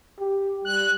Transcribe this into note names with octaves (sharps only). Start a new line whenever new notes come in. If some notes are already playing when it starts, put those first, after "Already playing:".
G4
G3 F#6